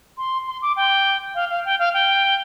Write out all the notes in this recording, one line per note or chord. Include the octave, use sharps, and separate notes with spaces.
C6
C6
D6
G5
F5
F5
G5
F5
G5